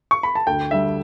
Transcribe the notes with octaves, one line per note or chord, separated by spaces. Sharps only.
C#6
B5
A5
D2 G5
D3 G3 E5